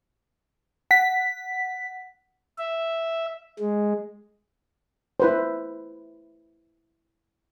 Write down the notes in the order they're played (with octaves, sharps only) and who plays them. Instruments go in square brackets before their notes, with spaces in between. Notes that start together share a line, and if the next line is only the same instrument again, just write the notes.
[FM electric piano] F#5 B6
[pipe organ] E5
G#3
[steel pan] E4 B4 C5